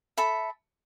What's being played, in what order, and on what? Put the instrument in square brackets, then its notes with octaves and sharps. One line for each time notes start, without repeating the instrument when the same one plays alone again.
[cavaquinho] A4 E5 B5